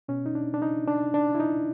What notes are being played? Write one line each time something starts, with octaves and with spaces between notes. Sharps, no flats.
B2 C#4
D#4
D4
D4
D#4
D4
D4
E4
D#4